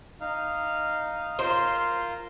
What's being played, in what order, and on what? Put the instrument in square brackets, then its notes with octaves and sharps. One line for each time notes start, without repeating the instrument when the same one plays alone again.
[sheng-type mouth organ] D#4 F5
[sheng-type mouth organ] F4 A#4 C6 [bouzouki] C5